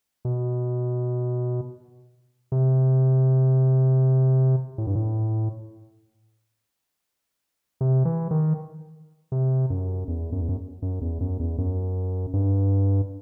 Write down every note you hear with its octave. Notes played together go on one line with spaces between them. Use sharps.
B2
C3
A2
G2
A2
C3
E3
D#3
C3
F#2
E2
F#2
E2
F#2
F#2
E2
F#2
E2
F#2
G2